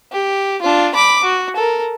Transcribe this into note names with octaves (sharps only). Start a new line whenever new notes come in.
G4
D4 F4
B5 D6
F#4
A4 A#4